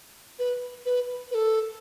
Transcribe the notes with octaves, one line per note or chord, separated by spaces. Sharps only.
B4
B4
B4
A4